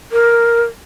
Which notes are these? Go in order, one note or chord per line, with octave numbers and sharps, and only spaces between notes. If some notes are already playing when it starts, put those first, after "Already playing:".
A#4